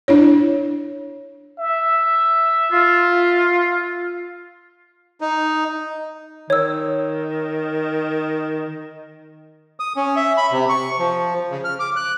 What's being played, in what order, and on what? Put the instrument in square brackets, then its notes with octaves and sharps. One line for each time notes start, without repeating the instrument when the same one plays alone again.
[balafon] D4 E4 C#5
[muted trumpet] E5
[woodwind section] F4
[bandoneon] D#4
[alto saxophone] D#3 [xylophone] C#5 E6
[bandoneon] D#6
C#4
E5
B5
C3
C#6
F3
C#3
F6
D6
F#6